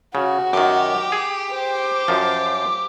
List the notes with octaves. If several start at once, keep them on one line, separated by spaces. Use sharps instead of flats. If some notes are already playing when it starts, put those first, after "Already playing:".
C#3 F#4
F#2 D#3 G4
G#4
C5
F#2 F3